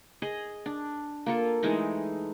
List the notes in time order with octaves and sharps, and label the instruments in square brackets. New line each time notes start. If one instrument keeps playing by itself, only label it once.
[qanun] G#4 D#5
D4
A#3 F4 A4
E3 G#3 A3 D#4